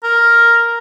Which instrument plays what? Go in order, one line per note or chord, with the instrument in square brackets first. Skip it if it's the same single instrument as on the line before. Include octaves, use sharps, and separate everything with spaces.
[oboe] A#4